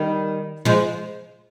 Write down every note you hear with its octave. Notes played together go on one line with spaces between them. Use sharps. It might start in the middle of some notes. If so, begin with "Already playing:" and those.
Already playing: D#3 G3
F3 G#3